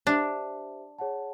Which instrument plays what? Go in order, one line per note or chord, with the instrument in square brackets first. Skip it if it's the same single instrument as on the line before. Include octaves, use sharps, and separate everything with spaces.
[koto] D4 [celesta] G4 C5 E5
[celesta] G#4 C#5 F#5 A5